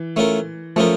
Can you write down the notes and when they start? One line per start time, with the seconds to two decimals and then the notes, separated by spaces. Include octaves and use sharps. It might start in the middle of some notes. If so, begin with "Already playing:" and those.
Already playing: E3
0.16 A3 C#4 F4 A#4
0.76 F3 A3 C#4 F4 A#4